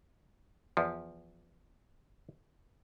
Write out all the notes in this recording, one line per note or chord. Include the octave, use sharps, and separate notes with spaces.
E2 F3